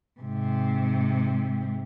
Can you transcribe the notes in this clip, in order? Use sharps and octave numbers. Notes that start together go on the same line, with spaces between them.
G#2 C3